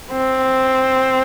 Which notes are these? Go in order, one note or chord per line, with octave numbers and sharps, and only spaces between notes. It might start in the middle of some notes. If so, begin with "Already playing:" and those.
C4